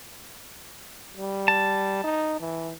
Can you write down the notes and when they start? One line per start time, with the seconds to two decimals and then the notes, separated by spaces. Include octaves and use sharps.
1.17 G3
1.48 A5
2.04 D#4
2.40 E3